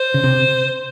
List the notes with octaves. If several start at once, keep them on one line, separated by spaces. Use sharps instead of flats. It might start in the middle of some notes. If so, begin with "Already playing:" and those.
Already playing: C5
C#3
C3